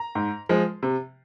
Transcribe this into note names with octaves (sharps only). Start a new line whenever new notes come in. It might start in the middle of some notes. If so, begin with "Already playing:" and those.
Already playing: A#5
G#2
F3 G#3
C3